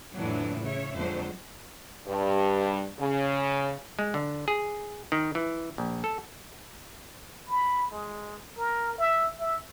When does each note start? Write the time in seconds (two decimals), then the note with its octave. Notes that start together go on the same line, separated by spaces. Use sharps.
0.14 F2 A2 D3 E3 F#3 D4
0.61 C#3 C#5 E5
0.94 F2 D3 F#3 G#3 C5
2.07 G2
3.00 C#3
3.99 G#3
4.14 D3
4.48 G#4
5.12 D#3
5.35 E3
5.78 A#1
6.04 A4
7.48 B5
7.91 G#3
8.58 A#4
8.98 E5
9.40 E5